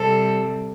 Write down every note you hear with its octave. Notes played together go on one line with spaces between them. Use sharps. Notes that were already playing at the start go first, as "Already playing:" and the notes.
Already playing: C3 G3 C4 A4